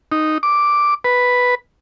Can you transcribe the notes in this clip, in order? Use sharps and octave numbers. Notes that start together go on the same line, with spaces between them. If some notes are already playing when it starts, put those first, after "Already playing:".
D#4
D6
B4